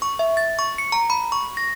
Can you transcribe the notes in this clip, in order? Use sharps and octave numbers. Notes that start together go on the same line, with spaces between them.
C#6
E5
A6
C#6
C#7
A#5
B5
C#6
A#6